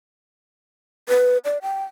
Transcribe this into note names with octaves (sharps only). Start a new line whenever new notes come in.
B4
D5
G5